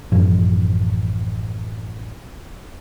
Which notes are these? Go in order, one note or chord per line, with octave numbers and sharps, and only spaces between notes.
A1 F#2 F3